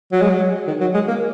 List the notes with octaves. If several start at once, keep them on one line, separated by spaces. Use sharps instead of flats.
F#3
G#3
F#3
D#3
F#3
G#3
A#3